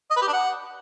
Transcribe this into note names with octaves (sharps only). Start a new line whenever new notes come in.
D#5
B4
G4
D4
F#5